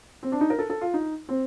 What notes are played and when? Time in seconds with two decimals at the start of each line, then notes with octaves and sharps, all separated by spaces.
0.23 C4
0.32 D4
0.41 D#4
0.50 A#4
0.59 A4
0.70 A4
0.81 F4
0.94 D#4
1.29 C4